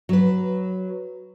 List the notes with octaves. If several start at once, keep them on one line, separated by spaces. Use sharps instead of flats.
F#3 B4